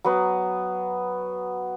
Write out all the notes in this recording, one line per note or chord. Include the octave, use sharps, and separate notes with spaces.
F#3 B3